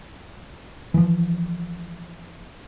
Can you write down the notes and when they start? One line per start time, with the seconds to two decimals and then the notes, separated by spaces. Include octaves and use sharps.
0.94 E3 F3